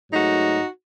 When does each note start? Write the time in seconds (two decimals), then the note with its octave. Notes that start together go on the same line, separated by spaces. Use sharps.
0.11 G#2 F#3 A3 D#4 F#4